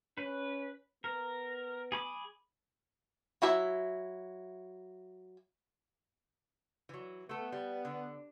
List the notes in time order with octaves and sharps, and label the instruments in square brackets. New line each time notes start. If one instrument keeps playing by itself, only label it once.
[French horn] C#4 [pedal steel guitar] B4
[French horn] B3 [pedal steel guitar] A#4
[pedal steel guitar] G#4 B5 D6
[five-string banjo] F#3 E4 E5
[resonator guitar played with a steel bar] E3 F#3
[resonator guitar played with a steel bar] A3 A4 [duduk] B3
[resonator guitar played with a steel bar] G3
D3